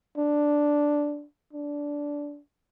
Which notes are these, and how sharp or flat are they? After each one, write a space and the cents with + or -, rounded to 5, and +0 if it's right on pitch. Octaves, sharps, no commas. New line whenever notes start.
D4 +0
D4 -15